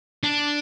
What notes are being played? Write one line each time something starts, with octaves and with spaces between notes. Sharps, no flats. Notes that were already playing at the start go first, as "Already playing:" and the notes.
D4